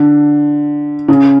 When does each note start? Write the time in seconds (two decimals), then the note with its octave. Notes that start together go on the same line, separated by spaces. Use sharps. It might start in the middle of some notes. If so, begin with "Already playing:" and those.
Already playing: D3
1.08 C#3